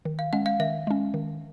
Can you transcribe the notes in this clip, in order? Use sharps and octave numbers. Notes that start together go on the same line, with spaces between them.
D#3
F5
G#3 C#4 F#5
F5
D#3 E5
G#3 C#4
D#3